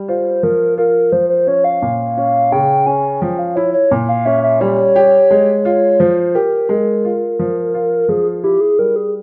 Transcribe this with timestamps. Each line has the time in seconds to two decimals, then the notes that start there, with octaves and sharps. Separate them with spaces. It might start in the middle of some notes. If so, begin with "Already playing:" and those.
Already playing: G3
0.08 F4 C5
0.43 F3 A#4
0.78 F4 A#4
1.12 F3 C5
1.29 C5
1.47 C#4 C#5
1.64 F5
1.82 A#2
2.17 C#4
2.52 C#3 G5
2.86 C#4 G#5
3.21 F3 G5
3.39 F5
3.56 E4 C#5
3.74 C#5
3.91 A#2
4.09 F5
4.25 C#4 E5
4.43 E5
4.60 G3 C#5
4.96 G4
5.31 G#3
5.65 F4
6.00 F3 C5
6.35 G4 A#4
6.69 G#3
7.05 F4
7.39 F3
7.74 F4
8.09 F3 G#4
8.43 E4 G4
8.61 G#4
8.79 G3 A#4
8.96 G#4